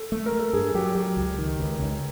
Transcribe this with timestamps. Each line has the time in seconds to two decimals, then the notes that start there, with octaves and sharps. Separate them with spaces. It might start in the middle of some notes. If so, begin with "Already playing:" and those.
Already playing: A4
0.12 A3
0.26 A#4
0.32 A3
0.39 A4
0.53 G2 G#4
0.74 F#3 G4
0.95 F#3 G4
1.17 C#2
1.38 D#3
1.60 C#2
1.80 C#2